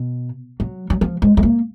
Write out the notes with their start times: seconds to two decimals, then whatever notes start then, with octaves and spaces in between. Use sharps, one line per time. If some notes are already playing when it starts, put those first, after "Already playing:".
Already playing: B2
0.60 F#3
0.90 F#3
1.01 F3
1.22 G#3
1.37 G#3
1.43 A#3